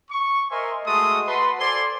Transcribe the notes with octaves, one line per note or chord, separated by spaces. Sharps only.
C#6
A#4 C5 D#5 E5 G#5 C6
G#3 A3 F#4 A4 C6 D#6
F#4 B4 F#5 A5 C6
A4 C5 D5 G#5 C6